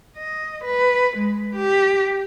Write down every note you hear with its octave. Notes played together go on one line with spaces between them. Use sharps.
D#5
B4
G#3
G4